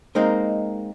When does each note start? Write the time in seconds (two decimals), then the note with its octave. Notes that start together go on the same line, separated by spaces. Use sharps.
0.15 G#3 A#3 C4 D#4 A#4